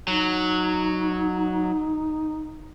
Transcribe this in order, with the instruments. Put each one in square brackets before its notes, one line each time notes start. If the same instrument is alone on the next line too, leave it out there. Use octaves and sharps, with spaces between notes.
[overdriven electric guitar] F#3 [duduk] D#4